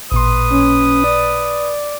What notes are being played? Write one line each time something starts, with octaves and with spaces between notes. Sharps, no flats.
A1 A#2 B4 C6 D#6
C#4
D5